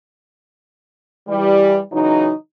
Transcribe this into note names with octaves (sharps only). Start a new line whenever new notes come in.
E3 G3
C#3 E3 F#3 D#4